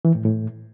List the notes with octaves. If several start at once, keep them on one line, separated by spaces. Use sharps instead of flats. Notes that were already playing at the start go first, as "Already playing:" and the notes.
E3
A2
A2